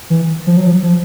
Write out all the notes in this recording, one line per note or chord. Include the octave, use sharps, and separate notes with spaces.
E3
F3
F#3
F3
F3